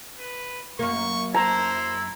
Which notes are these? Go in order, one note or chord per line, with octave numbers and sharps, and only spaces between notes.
B4
F#2 A#3 C#6
E4 C5 A#5